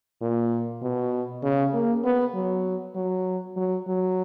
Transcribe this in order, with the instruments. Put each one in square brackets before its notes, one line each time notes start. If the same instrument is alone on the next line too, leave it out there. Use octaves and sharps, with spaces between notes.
[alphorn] A#2
B2
C#3
A#3
B3
F#3
F#3
F#3
F#3